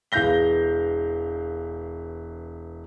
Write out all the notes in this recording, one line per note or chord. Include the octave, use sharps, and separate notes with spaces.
E1 E3 F5 G6 A#6 G7